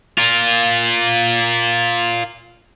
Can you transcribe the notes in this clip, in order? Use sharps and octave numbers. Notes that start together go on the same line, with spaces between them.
F4 A#4